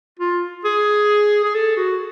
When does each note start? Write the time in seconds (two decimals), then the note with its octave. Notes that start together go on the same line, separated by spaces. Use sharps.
0.19 F4
0.65 G#4
1.44 G#4
1.54 A4
1.77 F#4